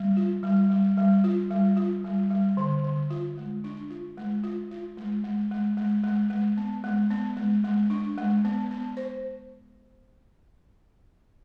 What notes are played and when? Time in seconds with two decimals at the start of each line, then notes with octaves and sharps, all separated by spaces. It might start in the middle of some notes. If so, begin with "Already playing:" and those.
Already playing: G3
0.17 F4
0.43 G3
0.70 G3
0.97 G3
1.24 F4
1.50 G3
1.77 F4
2.04 G3
2.30 G3
2.57 D3
2.84 D3
3.10 F4
3.38 G#3
3.64 D4
3.90 F4
4.17 G#3
4.43 F4
4.71 F4
4.97 G#3
5.24 G#3
5.51 G#3
5.77 G#3
6.04 G#3
6.30 G#3
6.57 B3
6.84 G#3
7.10 B3
7.37 G#3
7.64 G#3
7.90 D4
8.18 G#3
8.45 B3
8.71 B3
8.97 C5